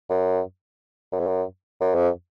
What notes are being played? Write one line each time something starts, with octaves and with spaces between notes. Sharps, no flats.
F#2
F#2
F2
F#2
F#2
F2